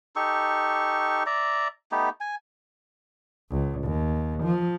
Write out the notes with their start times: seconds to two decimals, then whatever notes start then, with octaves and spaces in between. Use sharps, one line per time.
0.16 D#4 G4 A4 C#6
1.26 D5 E5 A#5
1.92 A3 B3 D#4 G4
2.20 G#5
3.51 C#2
3.83 D#2
4.44 F3